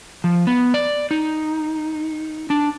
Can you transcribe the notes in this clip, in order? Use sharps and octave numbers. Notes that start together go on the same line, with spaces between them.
F3
B3
D5
D#4
D4